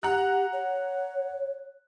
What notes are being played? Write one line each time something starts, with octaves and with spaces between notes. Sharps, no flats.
G4 F#5 A#5 F#6
C#5